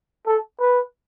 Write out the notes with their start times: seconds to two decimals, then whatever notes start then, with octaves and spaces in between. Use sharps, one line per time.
0.27 A4
0.60 B4